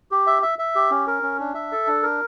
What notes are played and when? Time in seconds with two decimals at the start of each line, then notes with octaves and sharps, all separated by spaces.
0.11 G4
0.27 E5
0.42 E5
0.59 E5
0.75 G4
0.91 C#4
1.07 A#4
1.23 C#4
1.39 D4
1.54 E5
1.72 A4
1.87 D4
2.03 A#4